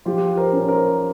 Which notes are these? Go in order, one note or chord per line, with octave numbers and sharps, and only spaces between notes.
F3 F4 G4
A#4 C5
C#4
A#4 C5